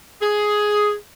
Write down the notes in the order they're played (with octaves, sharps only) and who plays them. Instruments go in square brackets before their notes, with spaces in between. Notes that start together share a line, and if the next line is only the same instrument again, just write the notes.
[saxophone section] G#4